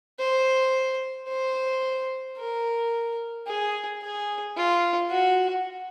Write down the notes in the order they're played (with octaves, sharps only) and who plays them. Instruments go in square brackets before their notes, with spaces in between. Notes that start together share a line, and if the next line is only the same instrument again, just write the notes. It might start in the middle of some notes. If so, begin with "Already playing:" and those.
[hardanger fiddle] C5
C5
A#4
G#4
G#4
F4
F#4